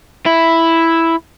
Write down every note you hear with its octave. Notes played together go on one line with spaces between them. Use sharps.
E4